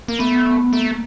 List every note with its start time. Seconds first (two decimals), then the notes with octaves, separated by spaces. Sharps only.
0.08 A#3
0.19 A3 B3
0.73 A3 A#3